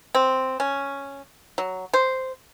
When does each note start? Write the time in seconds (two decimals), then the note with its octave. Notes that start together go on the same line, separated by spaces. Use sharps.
0.15 C4
0.60 C#4
1.58 F#3
1.94 C5